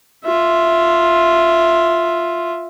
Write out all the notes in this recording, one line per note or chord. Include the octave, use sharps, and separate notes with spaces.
F4 E5